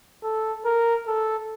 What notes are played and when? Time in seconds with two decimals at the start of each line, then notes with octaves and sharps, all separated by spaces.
0.23 A4
0.65 A#4
1.07 A4